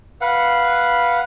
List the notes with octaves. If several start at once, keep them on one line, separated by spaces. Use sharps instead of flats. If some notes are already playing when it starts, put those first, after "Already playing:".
B4 F5 F#5